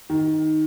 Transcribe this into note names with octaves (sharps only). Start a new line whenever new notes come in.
D#3